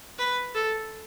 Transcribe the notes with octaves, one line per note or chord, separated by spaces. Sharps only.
B4
A4